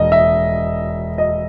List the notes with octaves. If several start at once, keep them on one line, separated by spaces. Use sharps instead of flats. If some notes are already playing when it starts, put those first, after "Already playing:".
Already playing: E1 D#5
E5
D#5